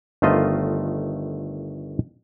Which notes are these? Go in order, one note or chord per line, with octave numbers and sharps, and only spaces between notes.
G1 D#3 A3 F4 C5 D#5